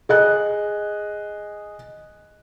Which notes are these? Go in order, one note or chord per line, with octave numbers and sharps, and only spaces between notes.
G#4 D#5 F#6